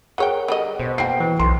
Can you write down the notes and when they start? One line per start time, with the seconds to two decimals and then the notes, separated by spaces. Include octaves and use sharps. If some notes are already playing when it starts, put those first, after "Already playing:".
0.18 F#3 G#4 A#4 C#5 F#5 G5
0.48 D3 G3 D#5
0.80 B2 C5
0.98 A#3 F#4 G5 C7
1.20 E3
1.39 B1 C6